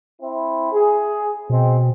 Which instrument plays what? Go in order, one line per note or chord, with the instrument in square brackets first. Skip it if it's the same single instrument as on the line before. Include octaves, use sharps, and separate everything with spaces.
[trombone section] C4 E4
G#4
[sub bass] B2 [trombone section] G#3 C4